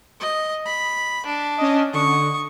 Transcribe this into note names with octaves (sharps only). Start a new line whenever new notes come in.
D#5
B5
D4
C#4 D#5
D3 C#6 D#6